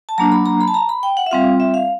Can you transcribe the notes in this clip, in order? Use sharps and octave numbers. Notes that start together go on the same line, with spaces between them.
A5
F#3 A#3 D4 A#5
B5
A#5
B5
A5
A#5
B5
G5
F#5
E5
G3 C4 F4 F5
E5
F5